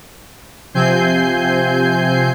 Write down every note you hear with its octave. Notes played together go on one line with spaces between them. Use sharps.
C3 F3 C4 G#5 G6 C7